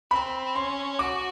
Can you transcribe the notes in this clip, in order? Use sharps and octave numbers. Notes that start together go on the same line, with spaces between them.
C4 B5
C#4 C6
F#4 D6